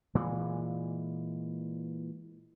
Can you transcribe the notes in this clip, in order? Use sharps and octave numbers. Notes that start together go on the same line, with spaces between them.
A#2 E3 G#3